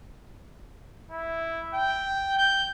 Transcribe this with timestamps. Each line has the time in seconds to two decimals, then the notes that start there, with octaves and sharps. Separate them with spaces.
1.12 E4
1.75 G5
2.38 G6